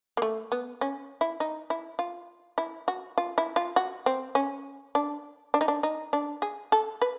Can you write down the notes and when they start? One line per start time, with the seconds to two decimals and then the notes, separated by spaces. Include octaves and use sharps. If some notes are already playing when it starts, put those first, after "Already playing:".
0.17 A#3
0.22 A3
0.52 B3
0.81 C#4
1.21 E4
1.40 D#4
1.70 E4
1.99 F4
2.58 E4
2.88 F#4
3.18 F4
3.38 E4
3.56 F4
3.76 F#4
4.06 C4
4.35 C#4
4.95 D4
5.54 D4
5.61 D#4
5.68 D4
5.83 D#4
6.13 D4
6.42 G#4
6.72 A4
7.02 B4